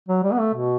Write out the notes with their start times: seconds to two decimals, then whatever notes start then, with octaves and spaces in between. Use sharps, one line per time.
0.08 F#3
0.23 G3
0.32 B3
0.40 A3
0.54 B2